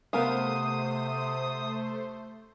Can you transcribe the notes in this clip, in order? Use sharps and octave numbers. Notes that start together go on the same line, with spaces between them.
C3 A3 B3 A#4 C5 F5 D#6